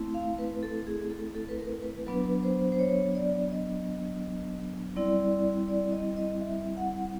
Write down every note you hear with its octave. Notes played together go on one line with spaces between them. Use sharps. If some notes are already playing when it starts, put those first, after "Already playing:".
Already playing: A3 C4 E4
F5
B4
A4
G#4
A4
A4
B4
A#4
B4
F#3 B3 D4 B4
C5
C5
C#5
D5
D#5
G3 C4 E4 D5
D5
D#5
D#5
E5
F#5